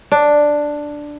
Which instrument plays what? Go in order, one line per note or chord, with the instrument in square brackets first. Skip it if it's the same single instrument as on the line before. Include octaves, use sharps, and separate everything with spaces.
[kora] D4